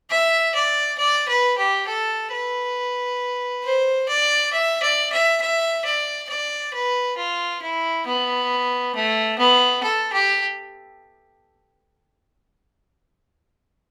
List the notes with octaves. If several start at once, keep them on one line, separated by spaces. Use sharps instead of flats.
E5
D5
D5
B4
G4
A4
B4
C5
D5
E5
D5
E5
E5
D5
D5
B4
F4
E4
B3
A3
B3
A4
G4